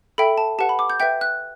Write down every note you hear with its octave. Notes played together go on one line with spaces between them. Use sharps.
A4 E5 G5 B5
A5
G4 B4 F#5 A5
B5
D6
G6
B4 E5 G5 G6
F#6